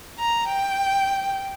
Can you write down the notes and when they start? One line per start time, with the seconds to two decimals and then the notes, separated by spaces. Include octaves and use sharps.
0.19 A#5
0.47 G5